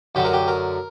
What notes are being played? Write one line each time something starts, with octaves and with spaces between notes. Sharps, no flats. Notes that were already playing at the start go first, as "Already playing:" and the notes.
F#2 D3 F#3 G4
A#4
G4
A#4